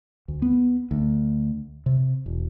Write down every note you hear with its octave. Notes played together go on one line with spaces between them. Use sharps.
D2
B3
D2
C3
E1